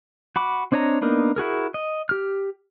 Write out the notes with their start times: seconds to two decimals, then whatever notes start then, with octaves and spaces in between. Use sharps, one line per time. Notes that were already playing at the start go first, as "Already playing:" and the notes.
0.36 F#4 B5 D6
0.72 C4 D4 C#5 D#5 A#5
1.02 A#3 B3 D4 D#4 A#4
1.36 E4 F#4 G#4 A#4
1.74 D#5
2.09 G4 F6